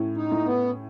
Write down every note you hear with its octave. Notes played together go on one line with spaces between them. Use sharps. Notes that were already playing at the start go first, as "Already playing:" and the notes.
Already playing: A2 C#4
D#4
A2
B3